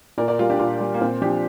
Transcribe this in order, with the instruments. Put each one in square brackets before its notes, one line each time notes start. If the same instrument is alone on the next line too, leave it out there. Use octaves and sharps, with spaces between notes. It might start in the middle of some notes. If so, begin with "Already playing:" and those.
[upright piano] A#2 A#4 D5
A#4 D5
G3 F4 A#4
D4 G4
A#2 F4 A#4
G3
A#3
A#2 C4
F3 D4 G4